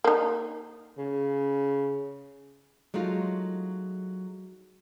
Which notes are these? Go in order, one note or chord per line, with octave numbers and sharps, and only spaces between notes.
A#3 D#4
C#3
F#3 G#3 A3 D#4 F4